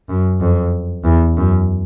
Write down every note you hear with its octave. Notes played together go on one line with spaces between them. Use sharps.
F#2
F2
E2
F#2